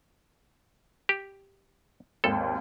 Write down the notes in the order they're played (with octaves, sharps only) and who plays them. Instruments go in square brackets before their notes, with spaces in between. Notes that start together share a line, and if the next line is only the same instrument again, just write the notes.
[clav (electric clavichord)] G4
[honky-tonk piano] G#1 D#2 [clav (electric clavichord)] A4